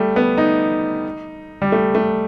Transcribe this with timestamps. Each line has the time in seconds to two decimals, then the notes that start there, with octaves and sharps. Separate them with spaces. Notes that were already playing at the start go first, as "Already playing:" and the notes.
Already playing: G3 A3
0.16 B3
0.38 D#4
1.62 G3
1.72 A3
1.95 A3